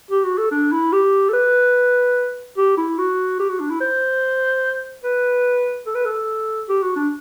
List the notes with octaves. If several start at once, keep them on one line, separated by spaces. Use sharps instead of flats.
G4
F#4
A4
D4
E4
G4
A4
B4
G4
E4
F#4
G4
F#4
D4
E4
C5
B4
A4
B4
A4
G4
F#4
D4